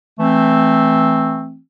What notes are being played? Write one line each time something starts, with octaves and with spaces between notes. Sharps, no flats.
E3 A3 C4